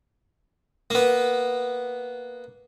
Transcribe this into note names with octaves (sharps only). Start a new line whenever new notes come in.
A#3 B3